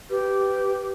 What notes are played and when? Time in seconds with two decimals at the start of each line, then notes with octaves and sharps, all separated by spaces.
0.10 G4 B4